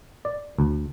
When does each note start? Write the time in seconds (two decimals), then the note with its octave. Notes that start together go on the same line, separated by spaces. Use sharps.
0.25 D5
0.59 D2